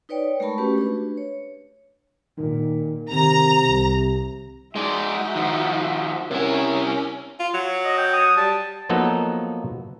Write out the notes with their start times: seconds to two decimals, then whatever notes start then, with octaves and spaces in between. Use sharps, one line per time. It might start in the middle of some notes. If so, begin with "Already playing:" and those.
0.09 D#4 B4 C#5 D5 G5
0.40 G#3 A3 A#4 A5 B5 C#6
0.58 A3 C#4 F#4 G4 B4
0.78 D4 B4
1.17 C#5
2.38 A#2 D#3
3.11 C3 D#3 A#5
3.63 C2
4.76 G#3 D#4 F#4 D5 E5
5.35 D#3 F3
6.31 C3 C#4 E4 A#4
7.40 F4
7.54 F#3
7.85 D#5
7.98 G5
8.13 D#6
8.37 G3 A5
8.89 F3 F#3 A#3 B3 D#4 A4